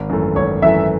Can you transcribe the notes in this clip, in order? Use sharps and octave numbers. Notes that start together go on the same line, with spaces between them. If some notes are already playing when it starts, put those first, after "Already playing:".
Already playing: G#1
F#2 E3 A3
G#1 C#5
F#2 E3 A3 E5